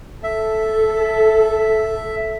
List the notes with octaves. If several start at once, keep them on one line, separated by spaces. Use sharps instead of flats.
A4 E5